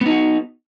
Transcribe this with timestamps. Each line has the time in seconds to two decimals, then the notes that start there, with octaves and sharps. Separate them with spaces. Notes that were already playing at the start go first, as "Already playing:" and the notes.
0.01 B3
0.06 D#4
0.10 F#4